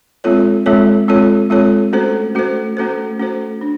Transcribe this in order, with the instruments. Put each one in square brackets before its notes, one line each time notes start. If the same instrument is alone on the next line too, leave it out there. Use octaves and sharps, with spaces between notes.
[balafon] G#3 C4 F4 A4 C#5
G#3 C4 F4 A4 C#5
G#3 C4 F4 A4 C#5
G#3 C4 F4 A4 C#5
A3 C#4 F#4 A4 C5
A3 C#4 F#4 A4 C5
A3 C#4 F#4 A4 C5
A3 C#4 F#4 A4 C5
D4